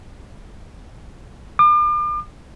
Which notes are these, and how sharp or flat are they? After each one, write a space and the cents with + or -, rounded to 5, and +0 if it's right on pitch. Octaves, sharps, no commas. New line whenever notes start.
D6 +40